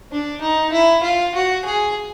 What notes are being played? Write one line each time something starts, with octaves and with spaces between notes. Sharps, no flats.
D4
D#4
E4
F4
F#4
G#4